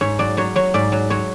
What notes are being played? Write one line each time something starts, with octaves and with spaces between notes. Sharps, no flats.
G#2 C#5
F#3 D5
F#3 C#5
F#3 C#5
G#2 D5
F#3
F#3 C#5